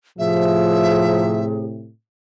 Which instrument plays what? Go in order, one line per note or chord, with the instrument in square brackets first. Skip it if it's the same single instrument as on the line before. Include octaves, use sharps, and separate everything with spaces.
[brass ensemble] A2 C3 [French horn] F3 [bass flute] G#4 [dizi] E5